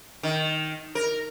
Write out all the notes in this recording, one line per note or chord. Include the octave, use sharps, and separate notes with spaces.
D#3
A#4